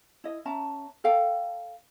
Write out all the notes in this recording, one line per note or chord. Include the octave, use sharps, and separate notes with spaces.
E4 D#5
C#4 E5 A5 A#5
A4 D5 F5 G5